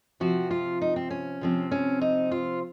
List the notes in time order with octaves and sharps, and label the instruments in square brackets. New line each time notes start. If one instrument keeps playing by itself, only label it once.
[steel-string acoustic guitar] C3 F3 C4 F#4
F4
D#4
C4
C#4
C3 F3 C4
C#4
D#4
F4